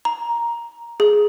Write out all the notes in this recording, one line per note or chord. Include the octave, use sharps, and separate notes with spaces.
A#5
G#4